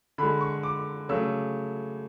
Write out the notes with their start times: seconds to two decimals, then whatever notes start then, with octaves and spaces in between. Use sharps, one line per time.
0.18 D3 G#3 B5
0.41 C#6
0.63 D6
1.09 C#3 F#3 A3 E6